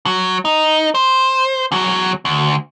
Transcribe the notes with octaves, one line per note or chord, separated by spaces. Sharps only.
F#3
D#4
C5
E2 F#3
D2